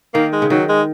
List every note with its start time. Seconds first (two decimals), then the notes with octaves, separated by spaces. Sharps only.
0.14 D#3 A#3
0.33 G#3
0.42 C#3
0.50 D#3 F#3
0.69 G#3